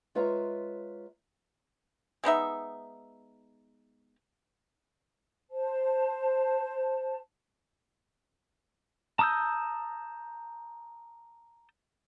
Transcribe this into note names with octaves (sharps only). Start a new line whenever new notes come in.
G#3 F4 B4 C#5 E5 A#5
G#3 B3 D#4 E5
C5 A5
A5 A#5 D#6 E6 G6